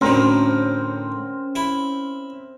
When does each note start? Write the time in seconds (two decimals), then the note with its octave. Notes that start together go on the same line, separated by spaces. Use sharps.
0.01 D2 A2 D3 C4 C#4 A#4 C5
1.56 E4